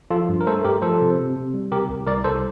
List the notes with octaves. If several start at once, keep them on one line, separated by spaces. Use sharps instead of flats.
F3 F4 A4
G2
A#4
A3 A4 C5
G2 G4 A#4
F3 A4 C5
C3
C3
C3
G3
C3 G4 A#4
C2
C2 A#4 D5
C2 A4 C5